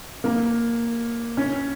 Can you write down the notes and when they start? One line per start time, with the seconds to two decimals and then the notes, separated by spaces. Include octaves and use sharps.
0.24 A#3
1.37 C#4